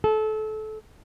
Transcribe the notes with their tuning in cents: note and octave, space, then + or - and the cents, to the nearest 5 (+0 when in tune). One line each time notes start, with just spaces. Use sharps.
A4 -25